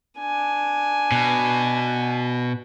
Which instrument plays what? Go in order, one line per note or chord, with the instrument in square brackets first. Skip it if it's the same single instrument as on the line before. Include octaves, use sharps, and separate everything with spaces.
[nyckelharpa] D4 G#5
[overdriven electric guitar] B2